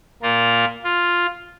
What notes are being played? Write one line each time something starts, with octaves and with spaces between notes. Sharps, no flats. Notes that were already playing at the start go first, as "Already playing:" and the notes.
A#2 A#3 F4 A#4
F4